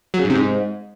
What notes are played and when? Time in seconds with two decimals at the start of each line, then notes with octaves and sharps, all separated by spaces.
0.14 F#3
0.19 C#3
0.25 G#2
0.30 C3
0.35 G#2